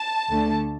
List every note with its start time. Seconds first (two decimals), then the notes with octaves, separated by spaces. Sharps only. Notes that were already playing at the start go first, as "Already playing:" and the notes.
Already playing: A5
0.30 D2 D3 A3